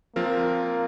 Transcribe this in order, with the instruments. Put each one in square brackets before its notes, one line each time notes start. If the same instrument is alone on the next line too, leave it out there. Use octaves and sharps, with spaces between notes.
[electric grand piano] F3 C4 F4 A#4 [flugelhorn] A#3